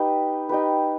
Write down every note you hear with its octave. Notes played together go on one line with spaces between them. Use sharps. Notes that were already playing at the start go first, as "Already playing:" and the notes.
Already playing: D#4 G4 B4
D#4 G4 B4